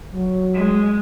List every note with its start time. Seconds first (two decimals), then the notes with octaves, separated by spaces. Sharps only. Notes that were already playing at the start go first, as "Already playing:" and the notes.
0.12 F#3
0.53 G#3